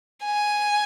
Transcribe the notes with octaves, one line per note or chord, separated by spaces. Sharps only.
G#5